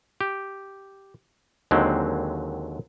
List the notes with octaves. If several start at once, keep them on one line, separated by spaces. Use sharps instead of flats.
G4
D#2 D3 D#3 F#3 G#3 C4